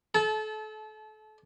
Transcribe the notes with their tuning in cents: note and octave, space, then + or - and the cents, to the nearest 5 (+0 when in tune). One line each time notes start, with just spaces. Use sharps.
A4 -35 A5 -25